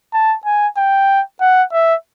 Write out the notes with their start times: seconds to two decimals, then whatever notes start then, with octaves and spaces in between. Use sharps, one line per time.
0.14 A5
0.45 G#5
0.77 G5
1.41 F#5
1.72 E5